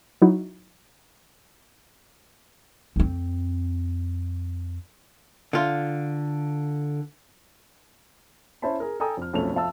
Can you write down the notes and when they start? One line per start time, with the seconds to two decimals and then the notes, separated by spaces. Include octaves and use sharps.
0.22 F#3 D#4 E4 F#4
2.96 F2 C4
5.53 D3 F4
8.62 C#4 E4 C5 E5 A5 B5
8.80 G#4 A#4
9.00 A4 G5 G#5 A#5 D#6
9.17 F2 F6
9.33 B1 F2 A3 C#4 F7
9.54 F2 C4 E5 F5 A5 E6